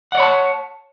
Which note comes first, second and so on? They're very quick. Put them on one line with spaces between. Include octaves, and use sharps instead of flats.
F#5 D5 C#5 B5 A5